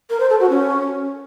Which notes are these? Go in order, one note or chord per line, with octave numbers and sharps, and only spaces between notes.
A#4
C5
A4
F#4
C#4